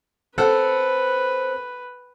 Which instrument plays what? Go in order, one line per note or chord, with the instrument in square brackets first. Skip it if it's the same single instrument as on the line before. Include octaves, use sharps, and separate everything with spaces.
[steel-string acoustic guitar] C4 [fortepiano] A4 F#5 [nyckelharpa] B4